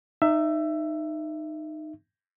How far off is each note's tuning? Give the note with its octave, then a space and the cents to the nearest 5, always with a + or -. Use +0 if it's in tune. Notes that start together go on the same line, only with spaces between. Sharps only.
D#4 -15 E5 +15